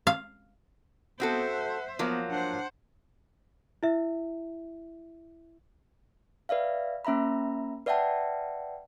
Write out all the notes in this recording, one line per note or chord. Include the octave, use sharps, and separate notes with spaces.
F5
B3 C4 F#4 A4 C5 E5
F#5
F3 F#3 A#3 B3
D4 C5 F#5
E4 E5
B4 D5 E5 F5
A#3 C#4 E5 A#5 B5
B4 D5 E5 F#5 G5 A5